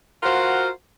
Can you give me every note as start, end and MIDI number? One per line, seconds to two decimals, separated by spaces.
0.23 0.69 65
0.23 0.69 66
0.23 0.69 70
0.23 0.69 72
0.23 0.69 77
0.23 0.69 78